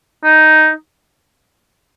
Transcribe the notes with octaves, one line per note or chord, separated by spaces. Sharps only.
D#4